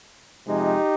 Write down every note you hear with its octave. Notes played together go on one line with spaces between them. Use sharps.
F2 C3 F3 G#3 C4 D#4 G4